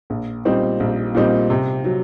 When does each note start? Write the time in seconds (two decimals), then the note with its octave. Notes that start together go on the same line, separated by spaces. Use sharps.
0.10 A#1
0.45 A#2 G3 C4 D#4
0.80 A#1
1.15 A#2 G3 C4 D#4
1.50 C3
1.84 F#3